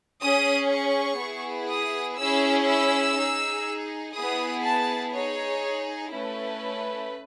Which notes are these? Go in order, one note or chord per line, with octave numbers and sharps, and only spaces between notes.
C#4 G#4 D#6
C#6
B3 E4 G#4
D#6
C#4 E4 G#4 E6
E6
D#4 G#4
B3 E4 G#4 D#6
A5
D#4 G#4 C#5
A3 C#4 E4 B4